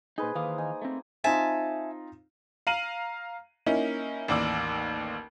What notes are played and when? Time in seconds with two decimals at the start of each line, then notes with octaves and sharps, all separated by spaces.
0.18 A#2 D#4 G#4 B4 C5
0.35 D#3 E3 A#3 G#4 F5 D#6
0.58 D#4 G#5
0.82 A3 C4
1.24 C4 D#4 F4 E5 G#5 A5
2.67 F5 A#5 D#7 F#7
3.66 A#3 C#4 D#4 E4
4.28 A1 D#2 D5 E6